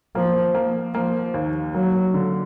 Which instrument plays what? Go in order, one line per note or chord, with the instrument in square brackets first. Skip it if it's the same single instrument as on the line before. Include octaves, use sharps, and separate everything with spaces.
[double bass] F3 [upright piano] A#3
[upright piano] A#3
[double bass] F3 [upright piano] A#3
[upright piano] D#2
[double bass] F#3 [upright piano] A#3
[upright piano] D3